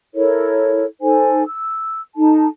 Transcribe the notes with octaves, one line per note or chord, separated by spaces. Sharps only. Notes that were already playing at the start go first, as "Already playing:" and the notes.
E4 A4 A#4 C#5
D#4 A4 C5 G#5
E6
D#4 A4 A5